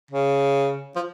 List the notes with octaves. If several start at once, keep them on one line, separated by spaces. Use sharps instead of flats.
C#3
F3